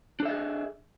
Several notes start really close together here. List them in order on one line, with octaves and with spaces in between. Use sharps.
D4 A4 E5 D#5 G#4